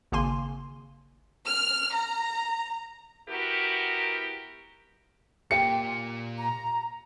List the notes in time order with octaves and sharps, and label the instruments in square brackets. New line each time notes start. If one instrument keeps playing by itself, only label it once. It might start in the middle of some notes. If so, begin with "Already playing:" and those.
[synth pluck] G#1 C#3 A#3 G#5 C6
[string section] F6
A#5
[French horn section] B3 E4 F#4 G4 A#4
[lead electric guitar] A#2 A#3 [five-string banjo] G4 F5 G5 [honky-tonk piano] C#7
[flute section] A#5